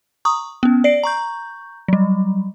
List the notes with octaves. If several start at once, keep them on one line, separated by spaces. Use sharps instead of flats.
A#5 C#6 D#6
B3 C#4
D5 C7 D7
A#5 C#6 G6
F#3 G3